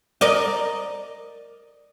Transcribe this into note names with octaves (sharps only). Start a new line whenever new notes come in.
A#4 D5 D#5